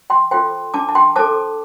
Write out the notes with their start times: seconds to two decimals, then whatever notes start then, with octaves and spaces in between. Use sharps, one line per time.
0.10 G5 C6
0.31 F4 A4 C5 G5 C6
0.74 D4 A5 D6
0.89 A5
0.95 G5 C6
1.16 A4 C5 A5 D6